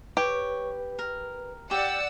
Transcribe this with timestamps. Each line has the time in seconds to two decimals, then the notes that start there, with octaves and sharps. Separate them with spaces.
0.17 G4 B4 C#5
0.99 A#4
1.71 G4 D5 F#5 E6